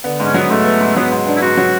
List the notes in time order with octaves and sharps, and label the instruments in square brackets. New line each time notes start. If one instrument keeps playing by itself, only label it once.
[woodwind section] D3 [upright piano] B3
[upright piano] G#2
[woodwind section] C#4
[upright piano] F#3 [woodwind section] B3
[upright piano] G#2 [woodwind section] A3
[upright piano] B3
G#2
[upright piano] F#3 [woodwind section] B3
[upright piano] G#2
[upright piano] B3 [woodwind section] D4
[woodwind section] E4
[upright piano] G#2 [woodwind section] F#4
[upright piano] F#3